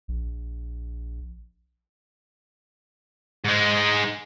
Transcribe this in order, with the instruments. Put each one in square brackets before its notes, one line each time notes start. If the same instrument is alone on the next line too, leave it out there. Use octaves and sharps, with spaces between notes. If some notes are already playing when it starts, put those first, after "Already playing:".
[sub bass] A#1
[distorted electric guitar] G#2 G#3